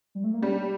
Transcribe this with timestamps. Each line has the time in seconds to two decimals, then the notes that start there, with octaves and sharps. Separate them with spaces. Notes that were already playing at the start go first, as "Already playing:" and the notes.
0.15 G3
0.24 A3
0.34 A#3
0.42 G3 C#4
0.52 D4
0.62 D4